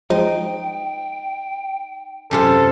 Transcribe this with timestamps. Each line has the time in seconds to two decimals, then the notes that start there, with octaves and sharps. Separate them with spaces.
0.10 F3 G#3 D#4 G5
2.31 F#2 C3 F4 A4